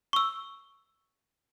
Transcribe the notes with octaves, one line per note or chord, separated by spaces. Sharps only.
C#6 E6